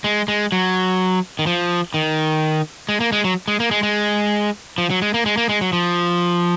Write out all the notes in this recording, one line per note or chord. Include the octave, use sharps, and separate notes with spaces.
G#3
G#3
F#3
D#3
F3
D#3
G#3
A#3
G#3
F#3
G#3
A#3
G#3
G#3
F3
F#3
G#3
A#3
G#3
A#3
G#3
F#3
F3